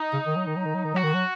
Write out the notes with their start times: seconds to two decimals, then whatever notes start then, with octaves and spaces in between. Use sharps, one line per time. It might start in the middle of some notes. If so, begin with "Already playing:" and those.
Already playing: D#4
0.13 C#3
0.26 D#3
0.36 F#3
0.47 D#3
0.56 F#3
0.66 D#3
0.75 F#3
0.85 D#3
0.94 F#3 F#4
1.04 D#3
1.14 F#3